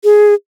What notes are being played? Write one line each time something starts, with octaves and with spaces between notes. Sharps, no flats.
G#4